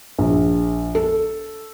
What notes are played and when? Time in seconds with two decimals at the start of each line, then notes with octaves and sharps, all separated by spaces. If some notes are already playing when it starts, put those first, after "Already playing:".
0.18 A#1
0.95 A4